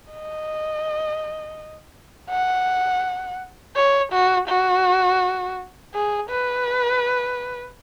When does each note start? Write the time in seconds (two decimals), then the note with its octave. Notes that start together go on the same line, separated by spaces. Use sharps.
0.13 D#5
2.30 F#5
3.76 C#5
4.12 F#4
4.48 F#4
5.94 G#4
6.29 B4